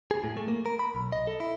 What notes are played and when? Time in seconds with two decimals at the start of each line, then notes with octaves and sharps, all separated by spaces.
0.11 G#4
0.24 A2
0.37 A3
0.48 A#3
0.66 A#4
0.79 B5
0.95 B1
1.12 D#5
1.27 A4
1.40 E4